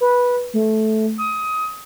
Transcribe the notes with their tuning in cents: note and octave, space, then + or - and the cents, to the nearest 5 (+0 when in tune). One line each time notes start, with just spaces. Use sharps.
B4 -15
A3 -10
D#6 +20